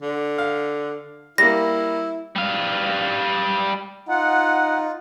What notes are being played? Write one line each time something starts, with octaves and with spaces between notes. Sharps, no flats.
D3
F5
G3 A#3 E4 A#6
G3 F5
D#4 F4 F#5